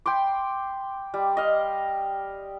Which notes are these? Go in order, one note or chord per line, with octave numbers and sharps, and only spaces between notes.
G5 B5 C6 D6
G3
D#5 F5